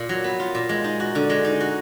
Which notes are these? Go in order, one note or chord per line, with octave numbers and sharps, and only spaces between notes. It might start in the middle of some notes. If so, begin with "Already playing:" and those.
Already playing: A#2
F#3
B3
F4
A#2
G#3
D#4
F#4
D3
G#3
D#4
F#4